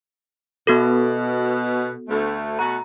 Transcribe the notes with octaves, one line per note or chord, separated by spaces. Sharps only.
B2 B3 F#4 A4
D2 A3
B2 A3 F#4 A#5